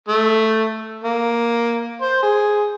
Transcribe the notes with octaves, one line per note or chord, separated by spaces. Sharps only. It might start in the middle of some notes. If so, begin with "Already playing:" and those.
A3
A#3
C5
G#4